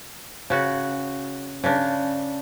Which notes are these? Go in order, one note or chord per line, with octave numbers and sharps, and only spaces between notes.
C#3 F#4
C#3 D4